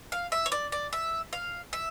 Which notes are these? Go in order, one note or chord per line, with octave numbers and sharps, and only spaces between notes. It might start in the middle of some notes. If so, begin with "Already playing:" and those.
F5
E5
C#5
D5
D5
E5
F5
E5